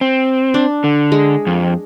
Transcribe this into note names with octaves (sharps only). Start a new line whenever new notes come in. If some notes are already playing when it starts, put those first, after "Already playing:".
C4
D4
D3
G#3
F2